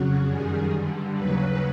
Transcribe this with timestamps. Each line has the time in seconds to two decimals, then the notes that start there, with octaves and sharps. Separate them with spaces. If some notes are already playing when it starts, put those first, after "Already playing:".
Already playing: F2 C#3 F#3 F#4
0.25 F#2 D#3 G3 G#4
0.70 G2 D3 G3
1.15 D#2 C#3 F#3 B4